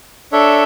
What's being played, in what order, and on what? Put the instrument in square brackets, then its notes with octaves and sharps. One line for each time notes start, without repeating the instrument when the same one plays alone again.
[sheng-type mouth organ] D4 A4 C#5 E5